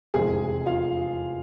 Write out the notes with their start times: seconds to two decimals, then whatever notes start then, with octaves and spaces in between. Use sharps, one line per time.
0.14 F1 E2 C3 G#3 C4 G#4 G#5
0.66 F4 F5